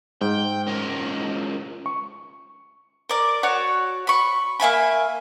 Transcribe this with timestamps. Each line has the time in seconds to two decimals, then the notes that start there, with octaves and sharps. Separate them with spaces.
0.21 G#2 G5
0.67 C#2 A#4
1.86 C#6
3.09 A#4 D5
3.43 F#4 C#5 D5
4.07 B5 C#6
4.60 A#3 E5 G#5 B5